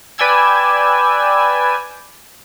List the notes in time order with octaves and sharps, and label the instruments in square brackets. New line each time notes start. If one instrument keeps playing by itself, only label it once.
[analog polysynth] B4 D5 G5 G#5 E6 G#6